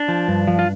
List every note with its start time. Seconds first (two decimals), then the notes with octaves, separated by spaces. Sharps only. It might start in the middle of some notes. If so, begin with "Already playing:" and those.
Already playing: D4
0.08 F3
0.28 G2
0.47 F3
0.59 F4